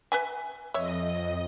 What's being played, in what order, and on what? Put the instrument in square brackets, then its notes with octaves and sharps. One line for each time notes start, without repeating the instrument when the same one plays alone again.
[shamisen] B4 E5 G#5
[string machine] F2 D#5 [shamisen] C#5 E5